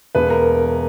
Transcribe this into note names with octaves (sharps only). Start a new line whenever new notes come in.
E1 B4
A#4